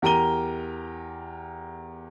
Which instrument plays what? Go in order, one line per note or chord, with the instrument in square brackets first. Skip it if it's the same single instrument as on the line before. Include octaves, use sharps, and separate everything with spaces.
[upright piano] E2 G4 A#4 A#5 D#7 G7